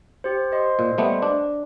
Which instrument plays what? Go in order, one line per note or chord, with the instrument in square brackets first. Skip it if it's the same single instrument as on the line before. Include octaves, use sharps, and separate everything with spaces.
[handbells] G4 C5
C5 D#5 C6
[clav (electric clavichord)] A#2
G3 A3 B3
D4